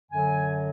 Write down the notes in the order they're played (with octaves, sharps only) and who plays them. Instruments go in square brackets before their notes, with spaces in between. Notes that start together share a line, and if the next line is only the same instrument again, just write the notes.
[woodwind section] F#2 D3 F#3 G#5